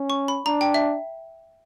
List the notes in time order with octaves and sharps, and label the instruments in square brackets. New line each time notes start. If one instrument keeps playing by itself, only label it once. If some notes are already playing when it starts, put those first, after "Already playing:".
Already playing: [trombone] C#4
[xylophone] C#6
B5
[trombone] D4 [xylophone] A#5
[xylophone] G5
E5